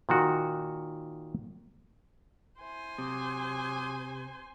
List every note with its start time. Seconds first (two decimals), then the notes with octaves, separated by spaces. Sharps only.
0.09 A#2 D#3 F#4
2.61 E4 C5 G#5
2.98 C3 F#3 D6 D#6